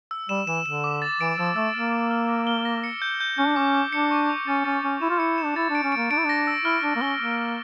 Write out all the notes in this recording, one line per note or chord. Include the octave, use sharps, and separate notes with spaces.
E6
G3 E7
E3 E7
D3 E7
D6
A6
E3 D7
F3 E6
A3 E6
A#3 F6
A6
F6
A#6
G7
A#6
C#7
G6
G6
C#4 G6
D4
C#4 D6
D6
D4 C#7
C#6
F7
C#4 A6
C#4 A6
C#4 A6
E4 E7
F4
E4 C#7
E7
D4
E4 A6
D4
D7
C#4
A#3 D7
D4 D7
E4
D4 A#6
E6
E4 F6
D4 F6
A#3
C#4 G7
A#3 D6
D7